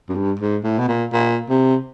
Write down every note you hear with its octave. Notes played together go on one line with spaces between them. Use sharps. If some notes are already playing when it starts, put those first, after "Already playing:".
F#2
G2
G#2
A2
B2
A#2
A#2
C3